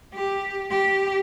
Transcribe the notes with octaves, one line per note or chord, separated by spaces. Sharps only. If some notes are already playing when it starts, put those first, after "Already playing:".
G4
G4